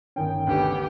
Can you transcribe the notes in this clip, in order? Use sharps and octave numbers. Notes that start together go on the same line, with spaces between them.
G1 D#3 C#4 G5
D2 B3 G4